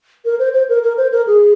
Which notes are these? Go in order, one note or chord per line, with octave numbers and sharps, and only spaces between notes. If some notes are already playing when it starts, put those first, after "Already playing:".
A#4
C5
C5
A#4
A#4
C5
A#4
G#4